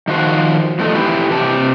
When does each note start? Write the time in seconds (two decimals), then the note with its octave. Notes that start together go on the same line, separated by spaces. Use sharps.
0.08 D#3 F3 F#4 C5
0.79 E2 F3 A3 D#4 A4
0.95 E3 E4 G4
1.31 C3 G4 A5